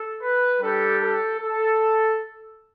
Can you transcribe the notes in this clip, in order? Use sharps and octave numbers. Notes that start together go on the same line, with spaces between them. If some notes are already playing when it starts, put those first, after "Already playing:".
Already playing: A4
B4
G3 D4 G4 A4
A4
A4